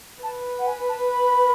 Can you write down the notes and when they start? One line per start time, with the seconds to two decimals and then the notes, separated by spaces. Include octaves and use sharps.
0.23 B4 A5
0.59 F#5
0.67 G#5
0.89 A5
1.11 B5